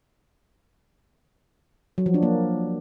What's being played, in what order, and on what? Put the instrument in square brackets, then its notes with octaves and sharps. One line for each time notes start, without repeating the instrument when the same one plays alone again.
[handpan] F#3
F3
D4
A#3